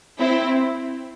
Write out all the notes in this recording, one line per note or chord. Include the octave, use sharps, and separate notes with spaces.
C4 E4